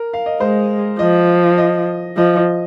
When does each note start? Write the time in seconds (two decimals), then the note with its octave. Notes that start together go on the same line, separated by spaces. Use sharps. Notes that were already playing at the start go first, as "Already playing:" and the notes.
Already playing: A#4
0.13 F5
0.26 D#5
0.40 G#3 C5
0.99 F3 D#5
1.58 D#5
2.17 F3 D#5
2.37 D#5